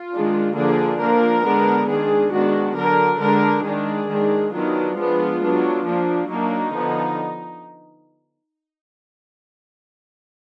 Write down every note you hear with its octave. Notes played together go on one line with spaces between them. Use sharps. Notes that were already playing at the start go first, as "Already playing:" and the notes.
Already playing: F4
D#3 G#3 D4
D3 F3 A#3 D4 G#4
F3 A#3 D4 A#4
D3 G#3 B3 D4
D#3 G#3 D4 G#4
D#3 G#3 B3 D4 F#4
D3 F#3 D4 A#4
D3 G#3 D4 A#4
D#3 G#3 D4 G#4
D#3 G#3 D4
D#3 F#3 B3 D4 F4
F3 G#3 B3 D4
F#3 B3 D4
F3 A#3 D4
F#3 A#3 D4 D#4
D3 F3 B3